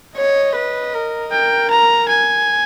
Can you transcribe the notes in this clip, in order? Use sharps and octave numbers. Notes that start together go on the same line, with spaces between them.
C#5 D#5
B4
A#4
A#4 G5
A#5
G#5